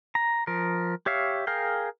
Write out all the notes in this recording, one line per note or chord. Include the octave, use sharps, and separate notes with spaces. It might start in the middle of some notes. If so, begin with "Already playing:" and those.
A#5
F3 A#4
G4 C#5 E5 F5
G#4 A#4 F5 G5